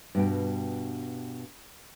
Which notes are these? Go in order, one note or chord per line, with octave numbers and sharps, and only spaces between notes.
G2 B2 G5